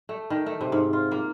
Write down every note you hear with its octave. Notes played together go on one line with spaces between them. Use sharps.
A3
D#3
A3
C3
G#2
F4
A#3